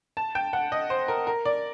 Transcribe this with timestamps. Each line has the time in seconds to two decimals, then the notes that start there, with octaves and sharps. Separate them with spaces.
0.17 A5
0.35 G5
0.53 F#5
0.72 D#5
0.90 C5
1.08 A#4
1.27 A#4
1.45 D5